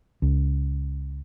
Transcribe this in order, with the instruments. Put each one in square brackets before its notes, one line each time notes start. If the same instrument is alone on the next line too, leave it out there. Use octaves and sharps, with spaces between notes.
[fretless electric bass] C#2